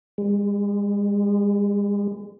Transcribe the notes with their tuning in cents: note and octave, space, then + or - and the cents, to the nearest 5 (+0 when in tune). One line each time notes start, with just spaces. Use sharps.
G#3 -40